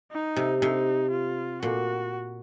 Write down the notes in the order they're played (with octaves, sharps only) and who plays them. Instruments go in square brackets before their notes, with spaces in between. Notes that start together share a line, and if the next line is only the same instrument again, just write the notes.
[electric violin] D#4
[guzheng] C3
[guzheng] C3 [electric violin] D#4
[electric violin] F4
[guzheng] A#2 [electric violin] F#4